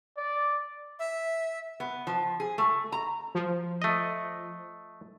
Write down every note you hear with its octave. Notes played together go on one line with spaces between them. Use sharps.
D5
E5
B3
F3
G#4
A3
A#5
F3
A3 D#5